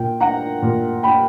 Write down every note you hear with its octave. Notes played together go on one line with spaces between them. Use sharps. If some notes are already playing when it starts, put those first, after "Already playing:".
Already playing: A#2 G5
F#5 A#5
A#2
G5 B5